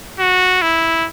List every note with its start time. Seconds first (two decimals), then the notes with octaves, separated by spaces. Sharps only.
0.19 F#4
0.62 E4